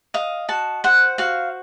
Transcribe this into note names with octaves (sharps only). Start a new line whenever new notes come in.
D#5 F5
F#4 A5
C5 F#5
F#4 F5